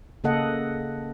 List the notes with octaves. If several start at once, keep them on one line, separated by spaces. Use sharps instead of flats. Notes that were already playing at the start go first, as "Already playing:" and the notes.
C#3 A#3 A4 D#5 F#5